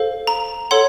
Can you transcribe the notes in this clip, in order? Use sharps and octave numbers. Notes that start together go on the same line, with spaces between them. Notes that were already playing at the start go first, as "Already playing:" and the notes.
Already playing: A4 C5 F5
A#5
A4 C#5 F#5 C6